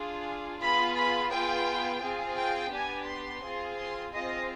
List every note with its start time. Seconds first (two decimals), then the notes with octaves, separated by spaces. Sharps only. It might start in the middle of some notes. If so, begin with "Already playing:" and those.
Already playing: D4 F4 G#4
0.61 B3 F4 G#4 B5
0.96 B5
1.31 B3 F4 G#4 G5
2.02 C4 F4 G#4
2.37 G5
2.72 B3 D4 G4 G#5
3.09 C6
3.43 C4 F4 G#4
3.79 C6
4.14 C4 F4 G#4 D#5